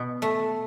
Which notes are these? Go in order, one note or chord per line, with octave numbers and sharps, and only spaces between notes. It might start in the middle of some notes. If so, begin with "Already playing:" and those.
Already playing: B2
A3